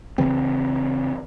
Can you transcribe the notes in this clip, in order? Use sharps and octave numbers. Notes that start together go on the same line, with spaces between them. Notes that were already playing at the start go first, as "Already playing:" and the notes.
C#3 E3 C4